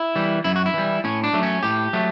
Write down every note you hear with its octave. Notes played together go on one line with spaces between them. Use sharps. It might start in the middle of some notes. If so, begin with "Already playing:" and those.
Already playing: E4
E3 G3
F#2 E4
F#4
E4
E3 G3
A2 C#4
D4
F#3 A3
C#4
A2 G4
F#3 A3